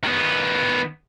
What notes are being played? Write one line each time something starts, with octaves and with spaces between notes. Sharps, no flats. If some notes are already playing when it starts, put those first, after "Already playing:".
D#3 B3